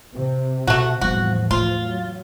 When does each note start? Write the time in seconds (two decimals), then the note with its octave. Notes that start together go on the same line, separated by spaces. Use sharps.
0.14 C3
0.67 B2 A3 F#4
1.01 E2 A2 F3 G3 B3 F#4
1.51 A3 F4
1.84 F#3